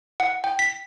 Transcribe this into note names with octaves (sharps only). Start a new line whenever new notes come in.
F#5
G5
B6